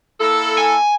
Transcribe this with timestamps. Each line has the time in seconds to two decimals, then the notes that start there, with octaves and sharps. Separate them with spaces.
0.20 A#3 E4 A4
0.58 G#5